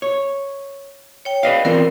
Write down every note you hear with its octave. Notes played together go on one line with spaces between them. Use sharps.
C#5
C#5 G5
B4 D5 D#5 F5
E3 C4 F4 A#4